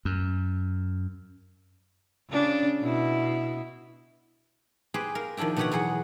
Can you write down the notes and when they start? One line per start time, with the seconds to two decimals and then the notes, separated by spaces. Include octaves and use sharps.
0.05 F#2
2.30 C#3 D4
2.82 B2 E4
4.94 G4 G#4 B4 C5
5.15 A#4 F5
5.37 D#3 F3 D4 E4 G4
5.56 B2 D3 G4 B4 C#5 F#5
5.72 E2 F#3 G#4 F#5